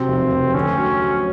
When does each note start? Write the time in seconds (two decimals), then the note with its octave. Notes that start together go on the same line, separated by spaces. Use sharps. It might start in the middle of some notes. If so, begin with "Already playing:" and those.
Already playing: C3 F#3 C4
0.08 F1
0.31 F1
0.54 D2 C#4
0.78 F#3
1.02 F#3